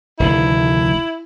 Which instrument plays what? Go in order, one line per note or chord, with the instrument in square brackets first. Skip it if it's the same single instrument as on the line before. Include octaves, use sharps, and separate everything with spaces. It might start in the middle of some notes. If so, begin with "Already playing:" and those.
[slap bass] F1 D2 D#3 [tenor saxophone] E4